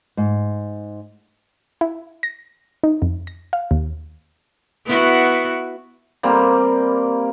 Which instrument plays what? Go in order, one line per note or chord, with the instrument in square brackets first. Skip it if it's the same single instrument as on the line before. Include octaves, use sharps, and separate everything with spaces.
[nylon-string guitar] G#2
[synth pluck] E4
A#6
D#4
F2
A#6
F5
D#2
[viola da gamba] B3 E4 F#4
[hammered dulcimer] G3 A#3 C4